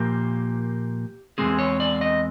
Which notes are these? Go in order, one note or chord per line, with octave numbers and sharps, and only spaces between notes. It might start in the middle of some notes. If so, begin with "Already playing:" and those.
Already playing: A#2 F3 A#3 G4
E2 B2 G#3 C4 G#4
C#5
D5
D#5